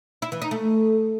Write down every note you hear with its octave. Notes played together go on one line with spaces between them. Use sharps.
E4
E3
D#4
A3